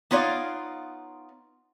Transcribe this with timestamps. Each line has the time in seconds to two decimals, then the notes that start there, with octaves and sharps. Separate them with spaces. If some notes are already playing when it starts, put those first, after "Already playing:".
0.11 B3 D#4 F4 C#5 D5 F5